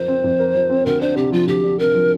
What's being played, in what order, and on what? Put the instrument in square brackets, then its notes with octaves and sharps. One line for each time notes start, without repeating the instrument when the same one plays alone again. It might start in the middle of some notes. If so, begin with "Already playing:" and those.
Already playing: [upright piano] F2 F3 A#4 [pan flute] C5
[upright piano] C4
F2
A#4
F3
C4
[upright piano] D2 [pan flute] A#4
[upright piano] D4 [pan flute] C5
[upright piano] C3 [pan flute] G4
[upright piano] F3 [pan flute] F4
[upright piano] D2 [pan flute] G4
[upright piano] D4
[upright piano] C3 [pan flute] A#4
[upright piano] F3